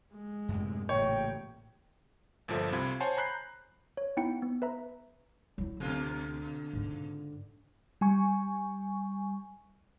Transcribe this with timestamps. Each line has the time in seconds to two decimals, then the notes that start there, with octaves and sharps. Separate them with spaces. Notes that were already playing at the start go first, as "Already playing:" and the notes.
0.15 G#3
0.49 F#2 A2 C3
0.89 A1 A#2 C#3 A#3 C#5 G5
2.48 G1 A#2 F3 A4 E5
2.72 C2 C3 F4 B5 G#6
3.00 C5 C#5 F#5 G#5 A5 C6
3.17 A#5 B5 F#6 G6 C7
3.97 C#5
4.17 B3 D#4 E4 F#5 G5 C#7
4.42 B3
4.62 B4 E5 A#5
5.58 F#3 E4
5.80 D2 B2 D3 A#3 F4
6.73 G#2 C#3
8.01 G3 G#5 C#6